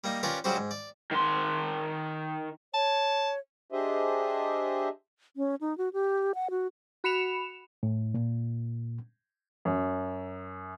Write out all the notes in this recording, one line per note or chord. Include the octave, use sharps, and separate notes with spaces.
G3 A#3 D#4
C#4 F4 G4 A#4 B4 D5
C#3 F#3 G3 F#4 G4 C5
G#2
D5
D#3 C6
C#5 A5
D4 G4 G#4 C5 D#5 E5
C#4
D#4
F#4
G4
F#5
F#4
F#4 B5 C#7 E7 F7
A2
A#2
F#2